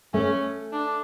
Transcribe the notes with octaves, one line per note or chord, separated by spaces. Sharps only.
A3 C#4
D4